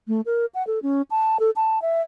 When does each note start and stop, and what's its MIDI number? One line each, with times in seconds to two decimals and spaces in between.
0.08 0.21 57
0.26 0.45 70
0.54 0.65 78
0.67 0.79 69
0.83 1.02 61
1.10 1.37 81
1.40 1.50 69
1.56 1.81 81
1.82 2.02 76